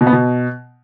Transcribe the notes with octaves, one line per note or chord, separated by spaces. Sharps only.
B2
B3
B2